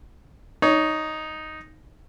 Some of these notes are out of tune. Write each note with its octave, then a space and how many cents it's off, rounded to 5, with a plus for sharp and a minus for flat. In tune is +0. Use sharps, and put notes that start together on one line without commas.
D#4 +0 C#5 +20